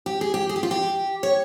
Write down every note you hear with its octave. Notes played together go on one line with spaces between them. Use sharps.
G4
G#4
G4
G#4
G4
F4
G4
C#5